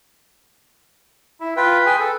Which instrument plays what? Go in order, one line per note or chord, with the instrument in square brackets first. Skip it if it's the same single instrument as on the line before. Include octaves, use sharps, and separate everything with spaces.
[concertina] E4
[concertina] F4 G5 [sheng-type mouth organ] B4
[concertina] G#4 G5 G#5
A4